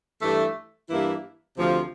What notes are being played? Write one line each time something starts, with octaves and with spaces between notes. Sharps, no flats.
G2 E3 A3
G2 E3 A#3 E4
D2 C3 F3